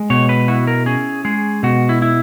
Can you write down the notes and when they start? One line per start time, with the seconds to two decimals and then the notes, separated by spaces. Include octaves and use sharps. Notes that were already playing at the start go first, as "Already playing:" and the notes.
Already playing: G#3
0.10 B2 C#5
0.29 B4
0.48 E4 F#4
0.67 A#4
0.86 C#4 G#4
1.25 G#3 G#4
1.63 B2 F#4
1.89 E4
2.02 E4